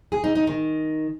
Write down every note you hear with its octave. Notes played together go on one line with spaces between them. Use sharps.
G#4
D#4
D#4
D#3